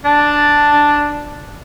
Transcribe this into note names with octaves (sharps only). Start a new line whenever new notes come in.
D4 A5